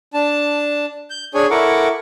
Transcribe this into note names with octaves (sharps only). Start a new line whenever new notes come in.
D4 A5
G6
D4 G#4 C#5 G#5
E4 A4 A#4 F#5 C#6 D6